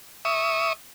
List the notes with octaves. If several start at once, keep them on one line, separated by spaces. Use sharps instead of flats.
E5 C#6 D#6